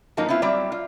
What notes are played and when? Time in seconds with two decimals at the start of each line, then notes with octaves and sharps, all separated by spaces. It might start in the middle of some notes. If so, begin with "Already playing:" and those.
0.17 G#2 F3 F#3 A#3 D#4
0.29 B3 C4 E4 F4
0.42 F#3 G3 C4 D5 E5
0.72 F4